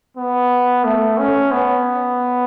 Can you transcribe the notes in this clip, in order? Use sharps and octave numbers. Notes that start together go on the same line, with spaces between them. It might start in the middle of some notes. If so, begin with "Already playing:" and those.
B3
A3
C#4
B3